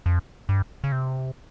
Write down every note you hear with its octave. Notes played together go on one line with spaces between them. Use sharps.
F2
G2
C#3
C3